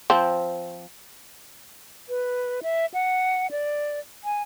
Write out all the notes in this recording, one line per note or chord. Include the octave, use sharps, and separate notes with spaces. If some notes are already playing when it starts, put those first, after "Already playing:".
F3 C4
B4
E5
F#5
D5
G#5